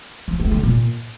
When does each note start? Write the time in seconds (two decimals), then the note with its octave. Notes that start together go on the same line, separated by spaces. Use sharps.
0.28 F3
0.40 A3
0.51 D3
0.63 A#2